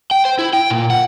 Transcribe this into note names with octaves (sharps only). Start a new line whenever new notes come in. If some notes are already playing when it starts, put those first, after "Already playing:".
G5
C5
E4
G5
A#2
F#5